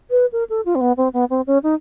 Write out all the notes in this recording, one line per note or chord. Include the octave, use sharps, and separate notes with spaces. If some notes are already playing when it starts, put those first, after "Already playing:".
B4
A#4
A4
F4
C4
B3
C4
B3
C4
C#4
D#4